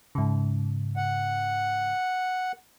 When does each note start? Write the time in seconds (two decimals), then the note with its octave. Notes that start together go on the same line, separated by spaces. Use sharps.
0.15 G#2 C#3
0.96 F#5